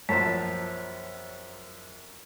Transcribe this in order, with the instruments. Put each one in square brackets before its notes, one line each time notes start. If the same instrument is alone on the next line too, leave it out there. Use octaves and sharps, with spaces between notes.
[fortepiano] A#1 F#3 A5 [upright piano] F#2 [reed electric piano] C5 C#5 [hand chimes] B6